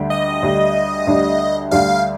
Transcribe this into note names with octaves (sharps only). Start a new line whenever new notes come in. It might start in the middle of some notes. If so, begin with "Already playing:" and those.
Already playing: D2 D3 G3 D4 G4
D#5
D2 D3 G3 D4 G4
D2 D3 G3 D4 G4
D2 D3 G3 D4 G4 F5